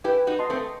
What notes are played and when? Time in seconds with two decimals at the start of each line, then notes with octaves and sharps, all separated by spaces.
0.04 E4 G4 B4
0.27 D#4 F#4
0.39 D#5 A5 C6
0.50 A3 C4